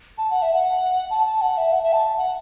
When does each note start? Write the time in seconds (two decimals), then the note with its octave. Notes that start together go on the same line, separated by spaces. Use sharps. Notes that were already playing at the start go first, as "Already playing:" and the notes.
0.18 A5
0.31 F#5
0.42 E5
0.54 F#5
1.10 A5
1.26 A5
1.41 F#5
1.57 E5
1.72 F#5
1.82 E5
1.93 A5
2.18 F#5